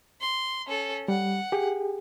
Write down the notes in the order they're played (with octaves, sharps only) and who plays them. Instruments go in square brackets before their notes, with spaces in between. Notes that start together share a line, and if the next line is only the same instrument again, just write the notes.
[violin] C6
C#4 A4
[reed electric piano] G3 [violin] F#5
[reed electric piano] G4 G#4